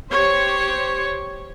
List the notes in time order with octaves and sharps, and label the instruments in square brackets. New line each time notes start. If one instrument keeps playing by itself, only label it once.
[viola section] G4 C5 C#5